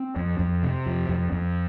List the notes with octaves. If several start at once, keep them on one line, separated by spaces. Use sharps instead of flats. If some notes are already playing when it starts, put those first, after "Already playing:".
Already playing: C4
F2
F2
C3
F2
F2
F2